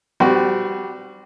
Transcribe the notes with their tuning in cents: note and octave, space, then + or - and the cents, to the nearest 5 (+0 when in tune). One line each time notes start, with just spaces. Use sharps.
G3 +0 C4 -30 F#4 +5